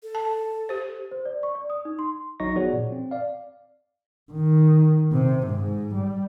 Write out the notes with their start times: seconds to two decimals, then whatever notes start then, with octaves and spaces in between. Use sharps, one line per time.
0.03 A4
0.15 A5
0.69 G4 C5
1.11 C5
1.25 D5
1.43 C#6
1.55 D5
1.70 D#6
1.85 D#4
1.99 C6
2.40 A1 F#3 D#4 D#5 C#6 A#6
2.56 F3 B3 F#4 G#4 C#5 D5
2.73 A#2
2.92 C4
3.11 D5 F5
4.32 D#3
5.13 C3
5.47 G#2
5.95 G3